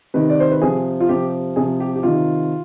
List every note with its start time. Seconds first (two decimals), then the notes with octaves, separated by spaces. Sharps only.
0.14 C3 D#3 B4
0.30 D5
0.40 C5
0.52 B4
0.61 C3 F3 G#4
1.00 F4
1.09 C3 F3 G4
1.56 C3 F3 G#4
1.80 G4
1.96 G4
2.03 C3 D#3 F4